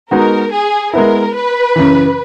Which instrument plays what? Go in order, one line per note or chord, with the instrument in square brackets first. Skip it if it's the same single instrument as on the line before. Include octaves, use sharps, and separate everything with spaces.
[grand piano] G#3 B3 D#4 F#4 [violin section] A#4
[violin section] G#4
[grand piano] G#3 B3 E4 [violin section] A#4
[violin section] B4
[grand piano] F#2 C#3 E3